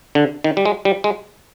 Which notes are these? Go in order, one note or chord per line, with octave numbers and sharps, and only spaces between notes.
D3
D#3
G3
G#3
G3
G#3